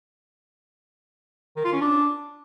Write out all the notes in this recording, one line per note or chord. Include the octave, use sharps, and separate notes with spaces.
D#3
F4
C#4
D4